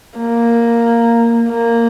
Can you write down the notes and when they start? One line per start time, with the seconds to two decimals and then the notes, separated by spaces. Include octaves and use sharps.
0.19 A#3
1.48 A#3